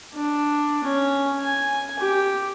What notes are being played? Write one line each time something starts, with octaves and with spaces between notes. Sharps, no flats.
D4
C#4
G#5
G4